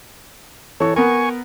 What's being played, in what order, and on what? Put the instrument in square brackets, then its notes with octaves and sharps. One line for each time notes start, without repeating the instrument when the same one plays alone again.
[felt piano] E3 C#6 [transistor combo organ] A4 C#5
[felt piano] B3 A#4 [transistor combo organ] G#5 C#6